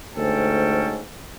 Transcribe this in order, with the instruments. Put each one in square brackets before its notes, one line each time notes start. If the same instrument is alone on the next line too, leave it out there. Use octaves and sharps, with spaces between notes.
[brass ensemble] D2 G#2 C#4 A4 G5